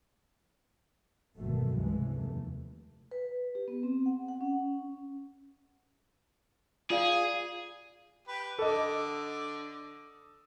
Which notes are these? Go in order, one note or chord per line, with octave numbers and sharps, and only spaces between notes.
G1 F2 B2 D#3 F#3 A3
C#2 G2 C3 E3 G#3
F1 D#2 A3
B4
G4
B3
C4
F#5
F#5
C#4
F4 G#4 D5 F5
G4 B4
D3 A4 D#5 D6